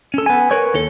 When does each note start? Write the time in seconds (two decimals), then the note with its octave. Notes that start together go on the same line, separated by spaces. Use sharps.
0.14 C#4 A4
0.26 B3 G#5
0.51 A#4 B4 C#5
0.74 D#2 A4